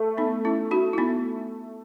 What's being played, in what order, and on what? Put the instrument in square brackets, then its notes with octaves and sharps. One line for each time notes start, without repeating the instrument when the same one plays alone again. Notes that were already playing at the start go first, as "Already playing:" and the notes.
Already playing: [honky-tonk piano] A3
[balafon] B3 D#4
C#4 E4
D#4 F#4
E4
B3 D#4